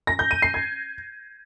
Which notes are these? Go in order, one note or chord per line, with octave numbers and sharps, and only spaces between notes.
A#6
G6
D#7
C7
G#6